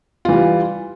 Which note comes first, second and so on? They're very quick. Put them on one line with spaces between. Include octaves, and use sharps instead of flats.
F4 E3 G3